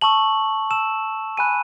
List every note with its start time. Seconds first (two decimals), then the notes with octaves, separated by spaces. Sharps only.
0.02 A5 C#6 E6 F#7
0.71 A5 E6 E7
1.37 G#5 B5 F#6 D#7